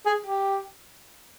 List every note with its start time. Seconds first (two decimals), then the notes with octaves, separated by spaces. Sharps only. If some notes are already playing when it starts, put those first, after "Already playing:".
0.06 G#4
0.26 G4